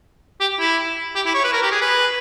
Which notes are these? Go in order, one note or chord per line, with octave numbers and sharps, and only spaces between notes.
G4
E4
G4
E4
C#5
B4
A#4
G4
G#4
B4